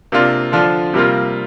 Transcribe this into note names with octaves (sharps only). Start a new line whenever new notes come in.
C3 A#3 D4 F4
D3 F3 D4 F4
C3 G3 A#3 F4